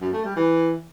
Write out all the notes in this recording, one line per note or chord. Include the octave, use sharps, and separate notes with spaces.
F#2
A3
G3
E3